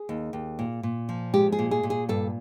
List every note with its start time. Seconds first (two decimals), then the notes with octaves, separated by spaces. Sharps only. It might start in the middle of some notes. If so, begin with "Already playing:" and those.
Already playing: G#4
0.09 D#2
0.33 D#2
0.59 A#2
0.83 A#2
1.09 F3
1.34 G#3 G4
1.52 G#4
1.59 A#2
1.71 G#4
1.83 A#2
1.90 G#4
2.09 G2 A4